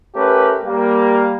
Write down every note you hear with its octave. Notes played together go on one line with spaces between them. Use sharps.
A3 C#4 G4 A#4 B4
G3 A#3